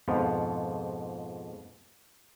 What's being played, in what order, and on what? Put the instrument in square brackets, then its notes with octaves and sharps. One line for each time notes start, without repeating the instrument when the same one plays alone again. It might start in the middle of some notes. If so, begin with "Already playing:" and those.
[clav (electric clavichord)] F2 G#2 B2 F3